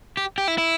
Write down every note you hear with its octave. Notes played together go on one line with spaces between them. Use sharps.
G4
G4
E4
E4